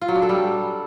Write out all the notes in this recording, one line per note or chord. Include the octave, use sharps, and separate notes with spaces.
F4
F#3
D4
A4
G3